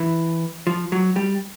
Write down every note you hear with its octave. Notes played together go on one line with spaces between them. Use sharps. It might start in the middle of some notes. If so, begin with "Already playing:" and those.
Already playing: E3
F3
F#3
G3